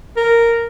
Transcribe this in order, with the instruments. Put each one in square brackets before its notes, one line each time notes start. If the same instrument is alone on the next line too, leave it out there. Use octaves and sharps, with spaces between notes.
[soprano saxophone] A#4